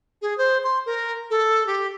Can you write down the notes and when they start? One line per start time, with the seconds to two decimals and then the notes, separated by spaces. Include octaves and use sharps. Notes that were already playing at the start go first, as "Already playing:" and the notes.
0.22 G#4
0.38 C5
0.64 C6
0.86 A#4
1.30 A4
1.67 G4